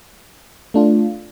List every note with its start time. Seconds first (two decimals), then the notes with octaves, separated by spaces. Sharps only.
0.74 A3 D4 F4